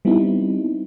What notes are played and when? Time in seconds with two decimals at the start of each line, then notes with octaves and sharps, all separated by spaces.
0.05 G3 B3 C4 D#4 E4